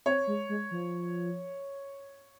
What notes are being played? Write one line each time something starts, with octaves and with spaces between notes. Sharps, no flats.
C4 C#5
G#3
G#3
F3